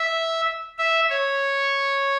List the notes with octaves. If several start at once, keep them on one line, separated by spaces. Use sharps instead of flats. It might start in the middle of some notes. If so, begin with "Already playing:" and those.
Already playing: E5
E5
C#5